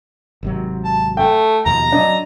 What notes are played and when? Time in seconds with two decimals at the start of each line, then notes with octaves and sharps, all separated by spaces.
0.43 G#1 C3 F#3
0.85 A5
1.17 A3 G5
1.66 D#2 B2 F3 A#5
1.92 F#3 C#4 D4 D#5